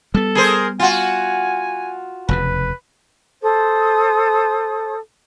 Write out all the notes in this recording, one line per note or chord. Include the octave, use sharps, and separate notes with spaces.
G3 B3 A4
G#4 A#4 C5
F4 F#4 G#5
F1 E2 C#3 B4
A4 C5 D#6